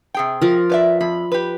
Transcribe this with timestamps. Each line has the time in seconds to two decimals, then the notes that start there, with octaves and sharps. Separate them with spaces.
0.14 C3 G#4 G5
0.41 F3 A#4
0.70 B4 D5 E5
1.01 F2 B5
1.32 G4 B4